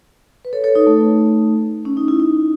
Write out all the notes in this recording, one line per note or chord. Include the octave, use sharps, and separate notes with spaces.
B4
A4 C#5
A4 C#5
D#4
A3
C#4
D#4
E4
D#4